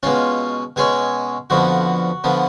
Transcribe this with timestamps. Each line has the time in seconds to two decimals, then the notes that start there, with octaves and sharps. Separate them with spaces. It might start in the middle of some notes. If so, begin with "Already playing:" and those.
0.03 B2 G#3 C#4 F4
0.76 B2 G#3 C#4 G#4
1.50 F2 D3 F3 B3 F#4
2.24 D3 F3 B3